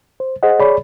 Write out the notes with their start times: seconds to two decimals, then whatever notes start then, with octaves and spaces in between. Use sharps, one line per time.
0.20 C5
0.43 G#4 C5 D#5 F#5
0.59 G#4 C#5 D5 B5